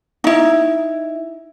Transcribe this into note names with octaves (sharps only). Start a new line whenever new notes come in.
D#4 E4